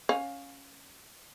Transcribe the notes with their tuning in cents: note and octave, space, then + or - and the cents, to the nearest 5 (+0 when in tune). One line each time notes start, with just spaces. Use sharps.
C#4 +0 F5 +15